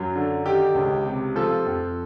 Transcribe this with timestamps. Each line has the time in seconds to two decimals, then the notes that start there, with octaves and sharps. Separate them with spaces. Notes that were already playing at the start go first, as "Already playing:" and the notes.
Already playing: F#2 F#3
0.16 D3
0.45 D#3 G4
0.75 C#2
1.06 C3
1.36 F3 A4
1.66 F2